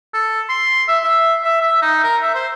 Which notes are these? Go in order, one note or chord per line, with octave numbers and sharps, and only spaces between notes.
A4
C6
E5
E5
E5
E5
D#4
A#4
E5
C5